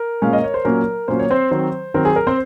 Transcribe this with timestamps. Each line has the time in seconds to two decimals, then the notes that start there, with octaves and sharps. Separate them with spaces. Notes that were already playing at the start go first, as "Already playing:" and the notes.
Already playing: A#4
0.22 A#2 G#3 C#4 F5
0.33 D#5
0.44 C#5
0.54 C5
0.65 A#2 F#3 A#3 C#4 A#4
1.08 A#2 F#3 A#3 C#4 C5
1.19 C#5
1.31 C4 C5
1.51 D#3 F#3 C4
1.94 D#3 F#3 C4 A#4
2.05 G#4
2.16 A#4
2.27 C4 C5